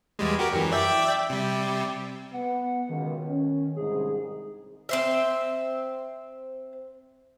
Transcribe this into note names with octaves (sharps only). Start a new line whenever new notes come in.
E2 G3 G#3
F#4 G4 A#4
F#2 E3
D5 E5 G5
C3 G3
B3 F#5
C#2 B2 D#3
C#4
C2 G#2 G#4
C4 C5 E5